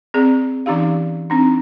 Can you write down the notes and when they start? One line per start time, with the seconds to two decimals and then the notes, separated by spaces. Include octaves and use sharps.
0.14 C4 G#4 D5
0.66 E3 C#4 D#4 G4 F5
1.30 C4 D4 D#4